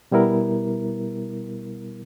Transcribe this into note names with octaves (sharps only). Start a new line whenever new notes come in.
B2 G3 B3 E4 A#4